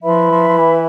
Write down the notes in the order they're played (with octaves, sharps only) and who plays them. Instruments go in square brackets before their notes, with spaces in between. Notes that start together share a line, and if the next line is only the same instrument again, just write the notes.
[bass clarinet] F3 [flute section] E4 B4 E5 B5
[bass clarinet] F3
F3
E3